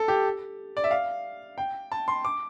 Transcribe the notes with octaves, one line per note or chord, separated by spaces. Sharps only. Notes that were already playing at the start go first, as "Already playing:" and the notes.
Already playing: A4
G4
D5
E5
F5
G5
A5
C6
D6